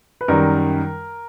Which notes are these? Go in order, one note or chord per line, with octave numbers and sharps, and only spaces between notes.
B4
F#2 D#3 G3 A#4